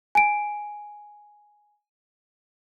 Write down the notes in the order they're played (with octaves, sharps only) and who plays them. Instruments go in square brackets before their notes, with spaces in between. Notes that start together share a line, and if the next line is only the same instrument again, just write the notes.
[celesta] G#5 D7